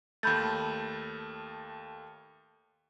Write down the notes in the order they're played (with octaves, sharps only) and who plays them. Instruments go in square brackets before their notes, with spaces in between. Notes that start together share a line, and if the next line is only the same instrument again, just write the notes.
[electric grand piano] D#2 A3 [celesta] B5 G6 A6